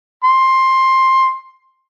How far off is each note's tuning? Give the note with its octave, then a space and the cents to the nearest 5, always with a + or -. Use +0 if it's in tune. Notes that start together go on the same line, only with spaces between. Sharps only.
C6 +15